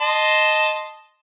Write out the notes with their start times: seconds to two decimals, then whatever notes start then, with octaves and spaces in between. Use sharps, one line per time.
0.01 D#5 A5 C6